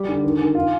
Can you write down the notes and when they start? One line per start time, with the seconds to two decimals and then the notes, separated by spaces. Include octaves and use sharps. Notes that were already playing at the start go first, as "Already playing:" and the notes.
Already playing: G3 G4
0.08 D3
0.24 D#3
0.39 D#3
0.55 F4